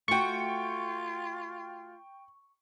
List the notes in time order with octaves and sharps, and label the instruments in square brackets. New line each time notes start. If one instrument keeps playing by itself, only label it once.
[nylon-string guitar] A3 F#4 [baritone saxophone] F4 [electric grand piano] G5 C#7 [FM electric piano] C#6